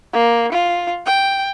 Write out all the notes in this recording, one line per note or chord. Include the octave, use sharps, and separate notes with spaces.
A#3
F4
G5